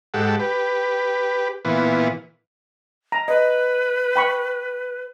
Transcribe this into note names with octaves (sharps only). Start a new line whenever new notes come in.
G#2 G4 A4 F#5
G4 B4
A#2 E3 B3
A#5
B4 D#5
G5 B5 C#6